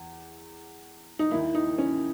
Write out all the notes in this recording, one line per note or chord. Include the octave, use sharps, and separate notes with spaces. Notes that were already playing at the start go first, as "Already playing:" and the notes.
Already playing: E2
D#4
D#2 D#3 A#3 E4
D#4
C#4